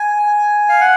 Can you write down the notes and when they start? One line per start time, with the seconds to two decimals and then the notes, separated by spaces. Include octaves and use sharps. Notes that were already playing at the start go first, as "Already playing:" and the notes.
Already playing: G#5
0.69 F5
0.81 F#5